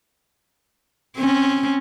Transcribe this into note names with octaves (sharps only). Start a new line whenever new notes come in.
C4 C#4